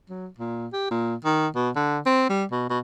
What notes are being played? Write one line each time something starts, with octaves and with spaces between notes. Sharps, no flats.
F#3
A#2
G4
A#2
D#3
B2
D3
C4
G3
B2
B2